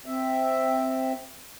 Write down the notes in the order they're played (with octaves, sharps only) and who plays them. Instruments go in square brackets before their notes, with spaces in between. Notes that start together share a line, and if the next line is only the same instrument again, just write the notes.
[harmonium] C4 E5